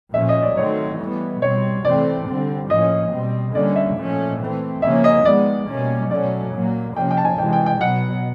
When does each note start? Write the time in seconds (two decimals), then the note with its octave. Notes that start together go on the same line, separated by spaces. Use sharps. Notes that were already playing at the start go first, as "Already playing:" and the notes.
0.14 A#2 F3 A3 C#4 E5
0.29 D#5
0.42 D5
0.57 D#3 F#3 A3 C4 C#5
0.99 E3 G3 B3
1.42 B2 G3 C4 C#5
1.84 C3 E3 A3 C4 D5
2.27 D3 G3 C4
2.69 A2 F3 A#3 C#4 D#5
3.12 B2 G3 C4
3.55 D3 G3 A#3 C#4 D5
3.76 E5
3.97 A#2 F3 A3 C#4
4.40 E3 A3 C4
4.82 C#3 F3 A#3 C#4 E5
5.04 D#5
5.25 D#3 G#3 B3 D5
5.68 B2 G3 A#3 C#4
6.10 B2 F#3 A3 C#4 D5
6.54 A#2 F#3 A#3
6.96 C3 F3 A#3 C#4 G5
7.11 G5
7.17 A5
7.25 G#5
7.38 C3 E3 G#3 G5
7.53 G5
7.66 G5
7.81 B2 F#3 B3 F#5